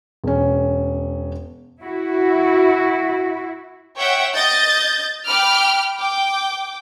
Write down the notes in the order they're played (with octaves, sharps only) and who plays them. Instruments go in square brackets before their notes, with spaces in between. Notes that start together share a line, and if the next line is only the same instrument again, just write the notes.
[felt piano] E1 C#4
[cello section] E4 F#4
[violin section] C#5 E5 F#5 G5
D#5 G6 A6
G5 B5 D6 F6
G5 D6